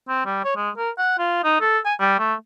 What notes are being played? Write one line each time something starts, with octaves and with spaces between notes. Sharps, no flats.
C4
G3
C#5
G#3
A#4
F#5
F4
D#4
A4
G#5
G3
A3